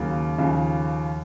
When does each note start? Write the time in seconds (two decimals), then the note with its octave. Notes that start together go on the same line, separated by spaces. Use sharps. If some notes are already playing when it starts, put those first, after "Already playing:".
Already playing: D#2 C#3 F#3 A#3
0.38 D#2 C#3 F3